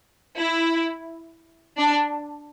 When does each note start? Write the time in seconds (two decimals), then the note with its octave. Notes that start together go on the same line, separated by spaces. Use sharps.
0.37 E4
1.78 D4